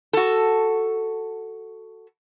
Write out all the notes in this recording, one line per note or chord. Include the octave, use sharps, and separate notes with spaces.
F#4 A4